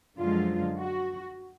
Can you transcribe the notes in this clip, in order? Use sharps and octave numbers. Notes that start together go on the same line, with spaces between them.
F#2 D3 F3 G#3 F4
F#4